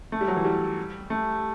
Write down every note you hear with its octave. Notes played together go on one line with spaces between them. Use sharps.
A3
G3
F#3
E3
G3
A3